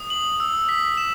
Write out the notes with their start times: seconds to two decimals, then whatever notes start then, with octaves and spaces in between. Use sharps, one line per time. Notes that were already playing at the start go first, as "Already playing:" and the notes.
Already playing: D#6
0.10 F#7
0.40 E6
0.69 B6
0.97 E7